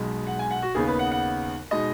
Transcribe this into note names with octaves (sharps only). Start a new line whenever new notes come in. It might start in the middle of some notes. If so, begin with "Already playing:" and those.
Already playing: B1 B2 G#3
F#5
G#5
F#5
F#4
D#2 C#3 B3 D#4 G#4
B4
F#5
F#5
B2 G#3 D#4 D#5